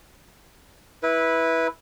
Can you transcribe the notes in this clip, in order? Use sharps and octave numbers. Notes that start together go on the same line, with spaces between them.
E4 B4